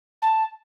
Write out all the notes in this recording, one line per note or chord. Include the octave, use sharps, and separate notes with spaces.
A5